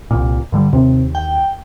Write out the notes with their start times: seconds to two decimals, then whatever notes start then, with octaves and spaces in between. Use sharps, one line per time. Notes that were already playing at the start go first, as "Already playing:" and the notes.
0.11 C2 A#2
0.52 G2 D3 G3
0.73 D#2 C3
1.15 G5